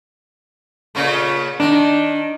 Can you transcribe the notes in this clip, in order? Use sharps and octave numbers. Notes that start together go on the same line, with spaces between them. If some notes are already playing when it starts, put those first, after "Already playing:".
A#2 C#3 A3
D#3 D4